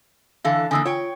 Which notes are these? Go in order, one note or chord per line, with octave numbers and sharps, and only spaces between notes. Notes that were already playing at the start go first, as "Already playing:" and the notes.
D3 E3 A4 F5
D3 E3 A#3 G#5 D#6 E6
F4 C#5 G5